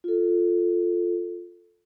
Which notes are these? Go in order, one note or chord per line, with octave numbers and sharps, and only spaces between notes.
F4 A4